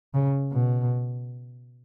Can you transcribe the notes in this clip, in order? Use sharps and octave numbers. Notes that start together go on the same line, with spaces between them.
C#3
B2